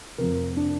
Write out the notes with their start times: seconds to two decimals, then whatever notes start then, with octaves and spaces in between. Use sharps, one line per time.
0.18 F1 F2 C3 F3 A#4
0.57 D4